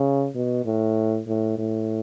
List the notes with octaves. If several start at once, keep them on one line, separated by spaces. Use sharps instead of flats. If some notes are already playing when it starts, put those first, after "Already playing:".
Already playing: C#3
B2
A2
A2
A2